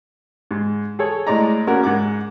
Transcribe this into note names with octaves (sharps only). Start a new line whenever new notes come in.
G#2
G#4 A4 C#5
A2 G#3 D5 A#5
A#3 C#4 F#4 A#4
G#2 F#5 D6